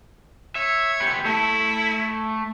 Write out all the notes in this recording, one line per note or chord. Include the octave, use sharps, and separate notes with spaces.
C#5 E5
B3 G4
A3 E4